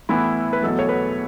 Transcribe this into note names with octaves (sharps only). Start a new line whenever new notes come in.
A2 E3 B3 E4
B4
E2 B2 F#3 A3 A4
C#5
B4